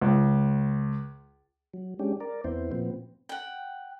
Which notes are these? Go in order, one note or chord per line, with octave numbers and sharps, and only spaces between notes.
C#2
F#3
G#3 C#4 D4 G4
A#4 D5
E2 B3 C4 E4 C5
A#2 F3 B3 C4
F#5 G5